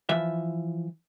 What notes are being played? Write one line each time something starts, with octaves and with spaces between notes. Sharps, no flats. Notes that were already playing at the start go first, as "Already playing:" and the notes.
E3 F3 E5